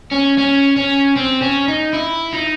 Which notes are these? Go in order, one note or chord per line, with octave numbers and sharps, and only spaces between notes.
C#4
C#4
C#4
C4
C#4
D#4
E4
D#4